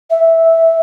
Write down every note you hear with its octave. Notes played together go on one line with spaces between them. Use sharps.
E5